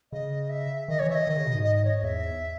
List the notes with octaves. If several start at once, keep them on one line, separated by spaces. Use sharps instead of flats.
C#3 D#5
E5
D#3 D#5
E3 C#5
E5
D#5
D#3
C#3
B2
G#2
D#5
D#5
C#5
E2 E5